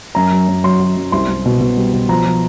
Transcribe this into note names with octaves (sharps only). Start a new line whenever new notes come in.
F#2 A#5
F#3
F#2
F#3 C6
F#3
F#2
C2 C6
C2
B2
B2
G3
B2
F3 A#5
F3